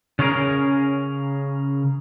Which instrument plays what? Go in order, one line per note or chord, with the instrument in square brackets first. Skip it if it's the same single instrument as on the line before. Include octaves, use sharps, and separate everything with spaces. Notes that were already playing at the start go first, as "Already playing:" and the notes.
[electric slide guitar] C#3 C#4 G#4 A#4